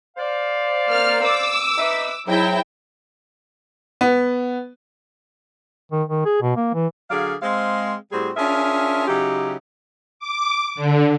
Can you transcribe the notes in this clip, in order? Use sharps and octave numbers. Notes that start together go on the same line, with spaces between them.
C5 D5 F5
A#3 F6
D6 E6
D#4 B4 E5
G#2 F#3 E4 G5
B3
D#3
D#3
G#4
B2
A#3
E3
D3 F#3 G#4 D5 F5
G#3 C4 F5
A2 G3 C4 F#4 G#4
C#4 D4 F4 G#4 A#4 E5
C#3 F#3 D#4 E4 G4
D6
D3